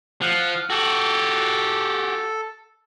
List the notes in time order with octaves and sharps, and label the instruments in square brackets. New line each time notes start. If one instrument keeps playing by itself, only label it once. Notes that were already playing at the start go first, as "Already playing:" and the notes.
[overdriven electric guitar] F3 [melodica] F#5
[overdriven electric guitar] F#4 G4 [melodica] A4